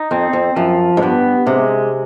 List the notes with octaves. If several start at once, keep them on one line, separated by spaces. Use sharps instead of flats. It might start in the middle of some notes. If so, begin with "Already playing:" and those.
Already playing: D#4
F2 C4
F2
F#2 F3
G#2
G2 B3
C3 G#3